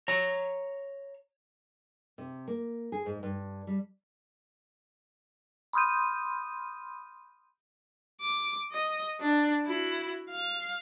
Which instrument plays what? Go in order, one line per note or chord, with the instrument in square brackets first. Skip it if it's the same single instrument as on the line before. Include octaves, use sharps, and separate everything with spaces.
[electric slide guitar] C#5 A#5
[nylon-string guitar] C3
A#3
G#4
G#2
G2
G3
[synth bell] B5 C6 D#6 F6 G6 D#7
[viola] D6
D#5
D4
E4 F#4
F5